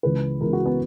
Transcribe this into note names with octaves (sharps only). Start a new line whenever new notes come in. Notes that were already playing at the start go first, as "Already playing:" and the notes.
C#2 C#3 E3 G#3 B4
C#2 C#3 E3 G#3 A#4
F#4
B3